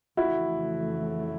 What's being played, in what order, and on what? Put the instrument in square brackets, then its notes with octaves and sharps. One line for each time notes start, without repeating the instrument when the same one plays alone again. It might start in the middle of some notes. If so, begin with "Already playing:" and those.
[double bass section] F2 C#3 E3 A3 [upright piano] E4 F#4